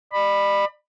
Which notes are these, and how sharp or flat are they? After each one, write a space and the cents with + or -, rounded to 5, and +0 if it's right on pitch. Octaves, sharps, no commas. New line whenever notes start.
D5 +40 B5 +0